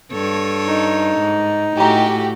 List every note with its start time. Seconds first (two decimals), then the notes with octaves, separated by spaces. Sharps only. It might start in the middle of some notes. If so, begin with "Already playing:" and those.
0.12 G2 A4 C#5
0.68 D#4 A#4
1.20 G#2
1.77 A2 F#4 G4 G#5 A#5